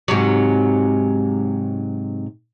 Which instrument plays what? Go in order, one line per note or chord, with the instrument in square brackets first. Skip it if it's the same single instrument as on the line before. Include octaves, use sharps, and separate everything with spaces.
[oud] G#2 C3 F#3